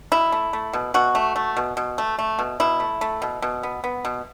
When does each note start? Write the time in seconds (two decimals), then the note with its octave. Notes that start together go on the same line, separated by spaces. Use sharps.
0.11 B2 E4
0.32 A3
0.53 A3
0.73 B2
0.94 B2 F#4
1.15 A3
1.36 A3
1.57 B2
1.77 B2
1.98 A3
2.19 A3
2.39 B2
2.60 B2 E4
2.80 A3
3.01 A3
3.22 B2
3.42 B2
3.63 B3
3.84 B3
4.05 B2